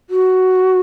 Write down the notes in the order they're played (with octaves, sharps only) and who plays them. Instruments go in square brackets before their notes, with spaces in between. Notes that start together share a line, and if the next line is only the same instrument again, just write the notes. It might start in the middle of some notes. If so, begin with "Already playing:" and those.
[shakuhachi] F#4